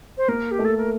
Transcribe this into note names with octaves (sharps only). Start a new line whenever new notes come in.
C5
A#3 A#4
G4
A3
A4
A#4